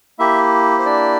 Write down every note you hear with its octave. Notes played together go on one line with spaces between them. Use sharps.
A#3 E4 G4 E5
C5
D4 D5